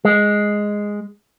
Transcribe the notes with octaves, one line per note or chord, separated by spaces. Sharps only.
G#3